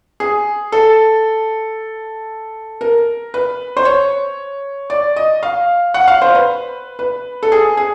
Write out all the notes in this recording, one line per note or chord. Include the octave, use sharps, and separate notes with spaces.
G#4
A4
A#4
B4
C5
C#5
D5
D#5
F5
F#5
F5
C5
B4
B4
A4
G#4
G#4